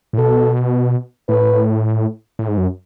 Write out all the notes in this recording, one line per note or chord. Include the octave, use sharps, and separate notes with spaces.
A2
B2 A4
A2 B4
A2
G#2
F#2